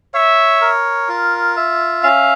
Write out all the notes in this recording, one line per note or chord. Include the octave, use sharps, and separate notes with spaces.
C#5 E5
A#4
F4
E5
C#4 F5